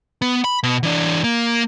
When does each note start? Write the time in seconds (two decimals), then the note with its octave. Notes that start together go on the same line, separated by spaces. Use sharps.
0.22 B3
0.44 B5
0.63 B2
0.83 E3 D4
1.24 A#3